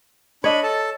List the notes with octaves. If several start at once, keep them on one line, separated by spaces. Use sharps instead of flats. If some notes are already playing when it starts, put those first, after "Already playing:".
D4 C#5 D#5 B5
A4 A5